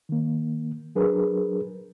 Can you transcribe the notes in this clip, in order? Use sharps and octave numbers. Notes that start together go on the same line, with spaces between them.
D#3 A#3
F#3 D4 G#4 A#4 B4